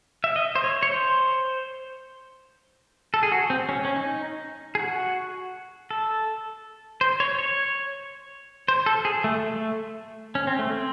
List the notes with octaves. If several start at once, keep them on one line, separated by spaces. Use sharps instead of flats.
E5
D#5
C5
C#5
C#5
C5
A4
G#4
F#4
C4
C#4
C#4
D#4
G#4
F#4
A4
C5
C#5
C#5
C5
A4
G#4
A3
A3
C#4
C4
A3
C4